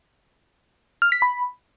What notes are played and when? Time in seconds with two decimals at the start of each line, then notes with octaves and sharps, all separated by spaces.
1.02 F6
1.12 B6
1.22 B5